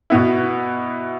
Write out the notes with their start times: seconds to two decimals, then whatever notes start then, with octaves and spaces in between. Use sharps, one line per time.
0.10 B2 B3 E4